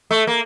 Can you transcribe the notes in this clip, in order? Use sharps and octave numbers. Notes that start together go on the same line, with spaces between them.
A3
A#3